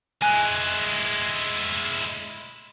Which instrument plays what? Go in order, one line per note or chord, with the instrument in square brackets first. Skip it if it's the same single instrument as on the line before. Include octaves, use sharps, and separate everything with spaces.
[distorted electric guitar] G#3 E4 [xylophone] G#5 F#6